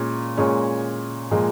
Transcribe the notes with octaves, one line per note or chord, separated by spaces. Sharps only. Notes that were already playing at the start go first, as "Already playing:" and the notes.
Already playing: A#2 G#3 C#4
A#2 G#3 C#4
A#2 F3 G#3